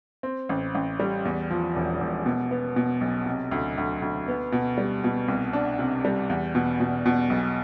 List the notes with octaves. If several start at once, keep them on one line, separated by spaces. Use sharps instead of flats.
C4
A1
A1
G3
E2
F3
E1
E1
B2
B3
B2
B1
C3
D2
D2
D2
B3
B2
G3
B2
C2
D4
C3
G3
E2
B2
B2
B2
B1